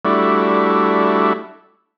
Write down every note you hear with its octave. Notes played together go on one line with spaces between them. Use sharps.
G3 A3 D4 E4 F#4